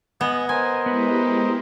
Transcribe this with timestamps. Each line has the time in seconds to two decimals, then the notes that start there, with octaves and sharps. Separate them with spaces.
0.21 B3 D#5 G#5
0.49 A#4 C5 D#5 G#5
0.86 G#3 B3 E4 G4 B4